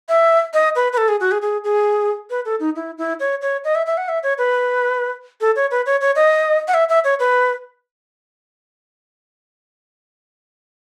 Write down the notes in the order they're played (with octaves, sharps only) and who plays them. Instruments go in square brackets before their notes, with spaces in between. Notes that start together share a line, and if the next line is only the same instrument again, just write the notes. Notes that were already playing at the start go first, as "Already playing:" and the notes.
[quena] E5
D#5
B4
B4
A4
G#4
F#4
G#4
G#4
G#4
B4
A4
D#4
E4
E4
C#5
C#5
D#5
E5
E5
F#5
E5
C#5
B4
A4
C#5
B4
C#5
C#5
D#5
F#5
E5
E5
C#5
B4